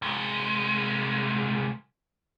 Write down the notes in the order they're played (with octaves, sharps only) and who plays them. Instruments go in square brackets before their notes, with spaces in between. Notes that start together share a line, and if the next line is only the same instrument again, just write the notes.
[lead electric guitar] C2 G#3